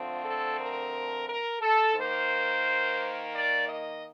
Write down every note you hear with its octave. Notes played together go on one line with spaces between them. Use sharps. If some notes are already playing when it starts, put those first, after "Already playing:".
Already playing: D3 F3 A3 C4 F4
A4
A#4
A#4
A4
D#3 A#3 C5
D5
D#5